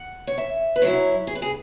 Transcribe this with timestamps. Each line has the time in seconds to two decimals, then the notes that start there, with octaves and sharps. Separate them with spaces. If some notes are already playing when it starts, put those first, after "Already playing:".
Already playing: F#5
0.27 C#5
0.38 E5
0.76 B4
0.82 F#2 F#3 E4 C#5
1.27 G#4
1.35 B4
1.42 G#4